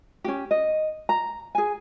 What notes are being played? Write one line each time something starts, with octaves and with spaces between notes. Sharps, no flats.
C#4 D#4 G4
D#5
A#5
G#4 G#5